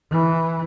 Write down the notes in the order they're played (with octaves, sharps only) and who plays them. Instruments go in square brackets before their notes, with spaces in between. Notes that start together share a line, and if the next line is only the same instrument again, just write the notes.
[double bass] E3